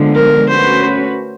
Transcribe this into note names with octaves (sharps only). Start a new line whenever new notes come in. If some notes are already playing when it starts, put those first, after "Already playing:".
Already playing: D3 F3 G#3 B3
A#4
A3 C#4 F#4 B4 C5